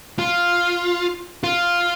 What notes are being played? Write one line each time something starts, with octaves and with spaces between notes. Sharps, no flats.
F4
F4